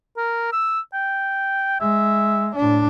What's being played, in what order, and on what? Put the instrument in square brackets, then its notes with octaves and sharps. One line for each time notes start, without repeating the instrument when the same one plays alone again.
[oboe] A#4
E6
G5
[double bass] G#3 [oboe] E5
[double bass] A2 D4